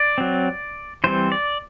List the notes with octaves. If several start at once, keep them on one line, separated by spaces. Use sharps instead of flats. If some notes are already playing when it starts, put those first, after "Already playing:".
Already playing: D5
F#3 C4
E3 G3 C4 C5
D5